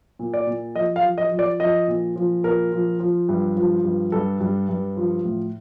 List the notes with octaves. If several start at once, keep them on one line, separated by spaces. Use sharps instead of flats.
A#2
D5
A#2
F3 D#5
F5
F3
D#5
F3
D5
F3 D#5
A#2
F3
A#2 A#4
F3
F3
G2
F3
G2
G2 A4
G2
G2
F3
A2